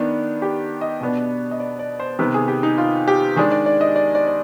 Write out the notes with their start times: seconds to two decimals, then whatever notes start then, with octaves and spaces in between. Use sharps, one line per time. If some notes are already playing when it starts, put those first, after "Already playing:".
Already playing: D#3 B3 D4
0.42 G4
0.81 D#5
1.01 B2 B3 D4
1.51 D#5
1.60 D5
1.79 D5
2.00 C5
2.19 C3 D#3 B3 B4
2.34 G#4
2.48 G4
2.63 D#4
2.78 F4
3.08 G4
3.36 D#3 G#3 D4 G#4
3.52 D5
3.66 D5
3.81 D#5
3.96 D5
4.15 D5
4.27 D5